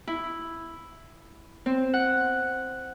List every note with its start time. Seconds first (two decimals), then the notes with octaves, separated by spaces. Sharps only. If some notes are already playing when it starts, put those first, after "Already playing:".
0.08 E4
1.66 C4
1.94 F#5